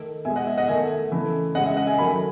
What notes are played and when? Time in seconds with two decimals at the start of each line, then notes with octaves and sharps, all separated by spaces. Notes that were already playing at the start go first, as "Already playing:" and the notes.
Already playing: D#3 A3
0.25 B2 G#3 E5 G#5
0.36 D#5 F#5
0.47 E5
0.57 D#5 F#5
0.68 D#3 A3 E5 G#5
1.12 C#3 E3 A3
1.55 C#3 D#5 F#5
1.58 G#3
1.65 E5
1.77 D#5 F#5
1.87 E5 G#5
1.98 D#3 F#3 A3 G#5 B5